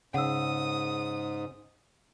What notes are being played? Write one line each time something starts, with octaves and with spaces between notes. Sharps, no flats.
G#2 C#3 F#5 D#6 E6